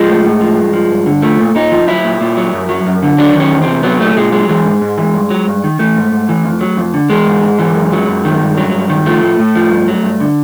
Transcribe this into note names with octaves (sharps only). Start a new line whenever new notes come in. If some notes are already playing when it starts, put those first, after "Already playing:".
Already playing: F3 G#3
A2
A2
F3
G2
F3
G2
D3
F3 A3
A#2
A#2 D#4
F3
F#3 E4
A#2
A#2
F#3
F#2
F#3
F#2
D3
F#3 D4
D#3 C#4
E2
C4
C3
F#3 B3
A#2 A3
A#2 G#3
F#3 G#3
E3 G#3
G#2
G#2
E3
G2
F#3
G2
D#3
E3 A3
G#2
G#2
E3
F2
F#3
F2
D3
E3 G#3
G#2
G#2
E3
F#2
F#3
F#2
D#3
G2
F#3
G2
D#3
F3 A3
A2
A2
F3
G2
F#3
G2
D3